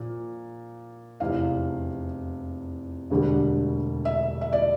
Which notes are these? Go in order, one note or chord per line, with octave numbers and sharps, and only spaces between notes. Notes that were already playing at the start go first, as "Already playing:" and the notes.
Already playing: A#2 F3
F1 E2 C3 F5
E1 D2 D3 G3
E5
E5
D5